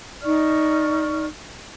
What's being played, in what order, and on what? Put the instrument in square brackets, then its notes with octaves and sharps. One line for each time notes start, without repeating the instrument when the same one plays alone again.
[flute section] D#4 D5 C#6 F6